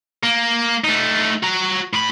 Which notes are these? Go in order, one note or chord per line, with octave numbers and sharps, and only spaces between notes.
A#3
A3 D#4
F#4 A#5
A2 B5